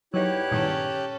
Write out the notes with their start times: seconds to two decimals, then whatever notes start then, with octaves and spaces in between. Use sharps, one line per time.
0.14 E2 F#3 D#4 E4 G4 C#5 F#6
0.51 G2 A#2 D#3 C#4 A4